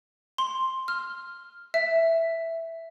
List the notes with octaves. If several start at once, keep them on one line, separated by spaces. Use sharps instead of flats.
C6
F6
E5